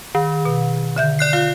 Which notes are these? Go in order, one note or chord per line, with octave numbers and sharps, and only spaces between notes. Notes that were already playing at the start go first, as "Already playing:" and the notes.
D#3
B2
D3 E5 G6
D5 F#6 C7
F4 F5